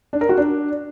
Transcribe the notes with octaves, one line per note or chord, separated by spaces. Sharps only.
D4
A#4
F#4
D4